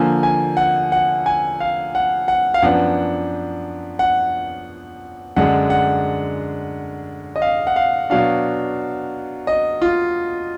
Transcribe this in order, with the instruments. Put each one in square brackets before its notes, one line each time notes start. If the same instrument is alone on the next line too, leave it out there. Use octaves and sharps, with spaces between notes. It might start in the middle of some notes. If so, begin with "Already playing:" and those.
Already playing: [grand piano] D3 F3 A#3 G#5
G#5
F#5
F#5
G#5
F5
F#5
F#5
F5
F#2 F3 B3 D4 F#5
F#5
F#2 D3 G#3 D4 F#5
F#5
D#5
F5
F#5
F5
B2 F#3 D4 F5
D#5
F4